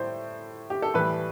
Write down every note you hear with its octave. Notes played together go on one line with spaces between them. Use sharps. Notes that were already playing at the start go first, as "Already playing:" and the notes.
Already playing: A2 G3 C5
G4
A4
A2 E3 G3 B4